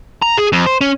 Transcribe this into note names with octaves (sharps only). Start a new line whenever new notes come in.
A#5
G#4
F2
C5
C#4